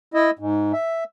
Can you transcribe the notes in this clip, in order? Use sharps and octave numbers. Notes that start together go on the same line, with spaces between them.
E4 D#5
G#2
E5